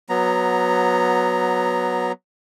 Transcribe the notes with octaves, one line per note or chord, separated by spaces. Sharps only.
F#3 B3 A#5